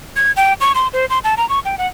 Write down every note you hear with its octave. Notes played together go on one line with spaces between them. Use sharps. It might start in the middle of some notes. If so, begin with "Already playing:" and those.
G#6
G5
C#6
C6
C5
C6
A5
A#5
C#6
G5
F#5